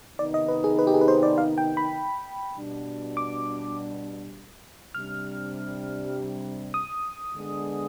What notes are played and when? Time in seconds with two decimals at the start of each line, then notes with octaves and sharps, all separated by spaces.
0.19 C3 D#3 B3 D#4 D5
0.34 D#5
0.49 B4
0.64 G#4
0.79 B4
0.87 G4
0.94 G#4
1.01 B4
1.08 C5
1.23 D5
1.38 F5
1.58 G5
1.77 B5
2.57 B2 G3 D4
3.17 D6
4.95 C3 G3 D4 F6
6.74 D#6
7.33 D3 G#3 B3 D4 G#4